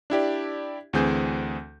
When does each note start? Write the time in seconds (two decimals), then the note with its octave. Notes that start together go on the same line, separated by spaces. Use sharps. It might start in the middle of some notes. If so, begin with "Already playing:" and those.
0.10 D4 E4 G4 D5
0.93 D2 E3 C4 G#4 G6